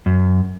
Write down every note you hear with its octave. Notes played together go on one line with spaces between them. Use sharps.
F#2